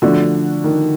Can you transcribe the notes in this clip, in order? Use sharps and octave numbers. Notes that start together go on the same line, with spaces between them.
D3 F3 A3 D4 F#4
D#3